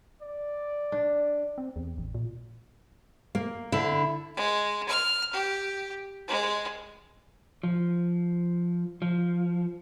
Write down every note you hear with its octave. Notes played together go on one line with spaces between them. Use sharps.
D5
D4
C4
E2
A1
A#2
A#3
D3 E4
G#3
F6
G4
G#3
F3
F3